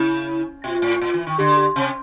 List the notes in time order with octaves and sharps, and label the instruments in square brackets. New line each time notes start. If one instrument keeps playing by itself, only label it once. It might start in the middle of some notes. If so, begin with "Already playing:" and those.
Already playing: [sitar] C#3 [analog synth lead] E4
[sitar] B2 [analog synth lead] F4
[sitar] A2
A#2
E3
D#3
[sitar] D3 [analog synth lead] G4
[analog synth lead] G4
[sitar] C3